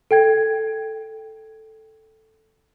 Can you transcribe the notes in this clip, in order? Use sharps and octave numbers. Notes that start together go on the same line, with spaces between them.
A4 G5 G#6